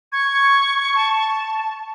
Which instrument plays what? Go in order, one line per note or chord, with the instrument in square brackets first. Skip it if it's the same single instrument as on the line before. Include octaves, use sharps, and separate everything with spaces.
[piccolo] C#6 [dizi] G#6
[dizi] A5